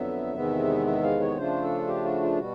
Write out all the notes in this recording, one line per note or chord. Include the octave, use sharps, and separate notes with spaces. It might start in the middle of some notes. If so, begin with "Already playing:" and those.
Already playing: F2 D3 F#3 B3 E5
E2 C3 D#3 G#3 B3
E5
F5
C#5
C#3 F3 A3 D4 F4 C5
A4
G4
F#4
F4
B2 G3 F#4